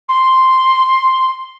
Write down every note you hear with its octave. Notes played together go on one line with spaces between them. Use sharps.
C6